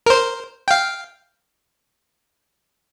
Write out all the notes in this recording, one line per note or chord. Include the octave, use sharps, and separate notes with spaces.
A#4 C5
F5 G5